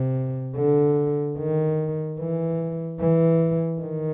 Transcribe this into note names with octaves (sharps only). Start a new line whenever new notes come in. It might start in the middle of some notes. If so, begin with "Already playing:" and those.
Already playing: C3
D3
D#3
E3
E3
D#3